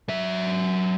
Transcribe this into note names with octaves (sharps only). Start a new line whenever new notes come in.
F#3 E5